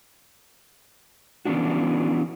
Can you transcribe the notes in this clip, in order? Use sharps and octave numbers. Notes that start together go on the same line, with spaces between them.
E3 B3 C#4 D4 F#4